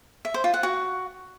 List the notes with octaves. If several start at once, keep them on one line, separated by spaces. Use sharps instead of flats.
E5
C5
F4
F#5
F#4